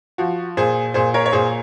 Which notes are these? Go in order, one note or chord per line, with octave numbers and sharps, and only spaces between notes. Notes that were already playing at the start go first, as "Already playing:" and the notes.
F3 F#4
A#2 G#4 C5
A#2 G#4 C5
A#4 C#5
C#5
A#2 G#4 C5